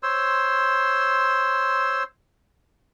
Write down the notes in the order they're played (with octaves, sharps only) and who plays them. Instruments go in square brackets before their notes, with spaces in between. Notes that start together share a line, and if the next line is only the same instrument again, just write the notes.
[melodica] C5 C#5 C6 E6